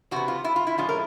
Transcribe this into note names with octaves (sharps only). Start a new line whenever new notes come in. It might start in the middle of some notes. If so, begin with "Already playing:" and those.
E2 C3 B3 F#4
F4
E4
F4
E4
A2 F3 G#3 C#4 F4
A#4